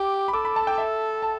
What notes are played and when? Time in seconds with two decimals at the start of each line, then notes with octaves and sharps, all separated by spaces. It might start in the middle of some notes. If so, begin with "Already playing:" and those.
Already playing: G4 D6
0.28 B5
0.33 A4 D6
0.45 B5
0.56 A5
0.67 G5
0.78 E5
1.22 A5